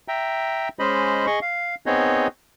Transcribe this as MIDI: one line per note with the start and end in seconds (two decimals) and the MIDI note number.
0.08 0.69 76
0.08 0.69 79
0.08 0.69 82
0.79 1.26 56
0.79 1.26 61
0.79 1.26 72
0.79 1.26 75
0.79 1.26 83
1.27 1.39 68
1.27 1.39 75
1.27 1.39 85
1.42 1.75 77
1.86 2.27 59
1.86 2.27 60
1.86 2.27 63
1.86 2.27 68
1.86 2.27 73
1.86 2.27 75